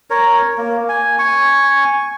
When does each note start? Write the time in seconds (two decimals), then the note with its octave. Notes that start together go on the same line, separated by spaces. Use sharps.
0.10 A#4 C#5
0.58 A#3
0.89 G#5
1.19 G#5 C#6